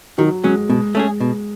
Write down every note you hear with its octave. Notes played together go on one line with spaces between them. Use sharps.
D#3 F#3
F#3 G#3 C#4
B2 G#3
A3 C#4 G#4
B2